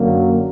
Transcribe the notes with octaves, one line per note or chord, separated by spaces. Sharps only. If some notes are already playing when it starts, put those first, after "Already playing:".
Already playing: F#2 D3 F#3 A#3